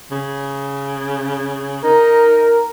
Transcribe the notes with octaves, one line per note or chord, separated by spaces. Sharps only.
C#3
D#4 A#4